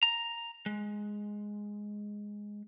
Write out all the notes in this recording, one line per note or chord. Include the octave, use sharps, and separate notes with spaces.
A#5
G#3